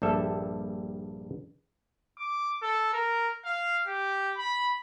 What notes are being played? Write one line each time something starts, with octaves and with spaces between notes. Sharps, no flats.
A#1 G2 G3 A4 E5
D6
A4
A#4
F5
G4
B5